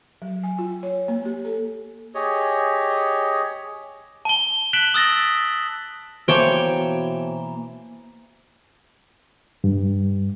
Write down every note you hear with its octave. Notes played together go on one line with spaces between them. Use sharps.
F#3
G#5
F4
C#5
A#3
G4
A4
G4 G#4 C#5 D#5
A5 G7
F#6 B6 D7 E7 F#7 G7
D#6 E6 A6 A#6
B2 E3 A#3 C5 C#5 G5 A5 D6
G2